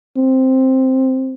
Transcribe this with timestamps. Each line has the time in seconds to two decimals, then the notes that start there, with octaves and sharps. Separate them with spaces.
0.16 C4